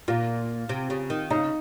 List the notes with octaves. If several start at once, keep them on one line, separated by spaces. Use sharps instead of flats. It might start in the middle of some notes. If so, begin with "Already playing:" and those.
A#2 F4
C3
C#3
D#3
C#3 D#4